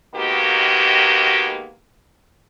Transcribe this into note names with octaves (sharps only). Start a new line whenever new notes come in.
D#3 G#3 A#3 B3 F#4 G4